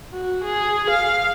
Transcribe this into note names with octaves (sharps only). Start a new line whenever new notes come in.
F#4
G#4
F5